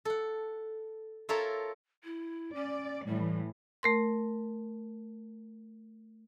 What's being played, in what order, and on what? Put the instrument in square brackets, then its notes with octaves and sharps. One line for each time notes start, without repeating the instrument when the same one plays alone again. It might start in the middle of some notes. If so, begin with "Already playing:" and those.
[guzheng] A4 F#5
F4 A4 A#4 C#5 E5
[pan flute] E4
[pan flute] C#4 [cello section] D5
[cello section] A2 E3 [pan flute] G3
[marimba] A3 A#4 C6